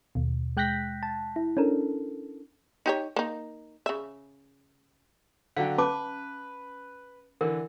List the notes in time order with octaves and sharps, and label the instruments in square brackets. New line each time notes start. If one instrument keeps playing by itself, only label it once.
[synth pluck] D#2 B2
G#3 G5 F#6 G6 A#6 B6
A5
E4
C#4 D4 A4 A#4
[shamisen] D#4 G4 C#5
A#3 D#4
C#3 E5
[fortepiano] D3 F#3 G5 [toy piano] F5
[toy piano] C#4 A5 D6 [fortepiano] B4
[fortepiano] D3 E3 [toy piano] A#4